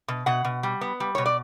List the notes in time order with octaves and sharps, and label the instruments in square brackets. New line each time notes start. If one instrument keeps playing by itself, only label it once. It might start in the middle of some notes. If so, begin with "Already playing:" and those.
[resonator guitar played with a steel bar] B2
B2 F#5
B2
G3
B3
G3
B2 C#5
D5